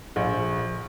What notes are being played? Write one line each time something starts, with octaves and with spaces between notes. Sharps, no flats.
A#1